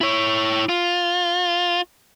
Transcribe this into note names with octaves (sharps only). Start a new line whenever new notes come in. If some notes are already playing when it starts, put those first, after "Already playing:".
E4 C#5
F4